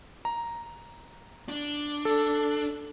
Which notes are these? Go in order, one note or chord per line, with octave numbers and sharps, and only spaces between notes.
A#5
D4
A4